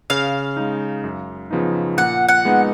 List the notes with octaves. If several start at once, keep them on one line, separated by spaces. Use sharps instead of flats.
C#3 F5
G#3 D#4
F#2
C#3 F3 B3 D#4
A#2 F#5
F#5
G#3 B3 D#4